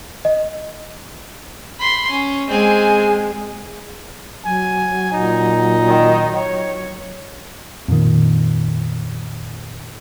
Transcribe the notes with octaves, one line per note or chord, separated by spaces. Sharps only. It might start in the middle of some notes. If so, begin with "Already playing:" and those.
D#5
B5 C6
C#4
G#3 C4 G#5
F#3 G#5
A#2 D#4
D#3
C#5
F2 A#2 D#3